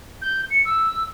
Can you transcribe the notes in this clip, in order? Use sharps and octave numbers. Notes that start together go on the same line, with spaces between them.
G6
C#7
E6